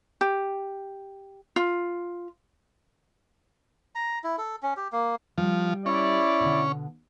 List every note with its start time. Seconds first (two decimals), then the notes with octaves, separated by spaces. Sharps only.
0.21 G4
1.56 F4
3.95 A#5
4.24 E4
4.38 A4
4.63 C#4
4.77 G4
4.92 A#3
5.38 F3 G3
5.86 C#4 E4 D5
6.40 B2 D3